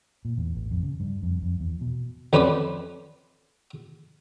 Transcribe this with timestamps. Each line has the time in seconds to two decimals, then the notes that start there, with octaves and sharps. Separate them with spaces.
0.25 A#2
0.38 E2
0.55 A1
0.71 F2
0.83 C#3
1.00 G2
1.22 F2
1.43 F2
1.60 E2
1.81 B2
2.33 F2 C#4 B4 C5 D5 B5